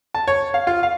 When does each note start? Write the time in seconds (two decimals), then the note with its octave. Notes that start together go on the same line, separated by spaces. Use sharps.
0.14 A5
0.27 C#5
0.54 F5
0.67 F4
0.83 F5